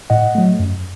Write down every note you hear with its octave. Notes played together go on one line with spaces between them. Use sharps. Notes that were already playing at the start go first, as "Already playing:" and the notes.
A2 D#5 F#5
F#3 A3
F#2